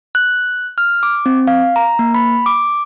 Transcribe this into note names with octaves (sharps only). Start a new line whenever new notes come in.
F#6
F6
D6
C4
F5
A#5
A#3
B5
D6